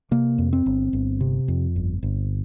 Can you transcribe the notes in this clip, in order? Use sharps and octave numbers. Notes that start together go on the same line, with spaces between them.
C3 A#3
F2
C4
G1
G1
C3
F2
G1
G1